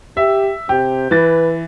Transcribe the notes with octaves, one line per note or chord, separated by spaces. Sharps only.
G4 E5
C3 G4
E3 B4 A6